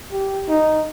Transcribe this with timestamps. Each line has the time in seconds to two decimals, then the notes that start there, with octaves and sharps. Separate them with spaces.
0.12 G4
0.49 D#4